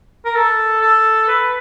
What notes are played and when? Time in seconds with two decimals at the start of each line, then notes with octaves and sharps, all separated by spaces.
0.25 A#4
0.35 A4
0.81 A4
1.28 B4